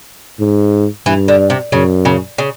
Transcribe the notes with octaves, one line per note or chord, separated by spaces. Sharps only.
G#2
G2 E3
D3
C3
F#2 C#3
C#3
C#3